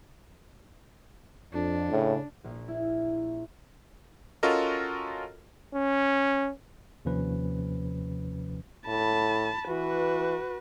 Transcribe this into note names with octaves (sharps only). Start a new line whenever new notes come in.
F2 D4
A2 C#3
A#1
E4
C#4 F4 F#4 A4 A#4 D#5
C#4
D#2 C3 F3 C#4 B4
A2 A5 B5
E3 F#4 B4